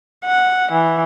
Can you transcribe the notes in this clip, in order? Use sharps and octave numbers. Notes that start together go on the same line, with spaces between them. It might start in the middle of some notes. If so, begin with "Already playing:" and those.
F#5
E3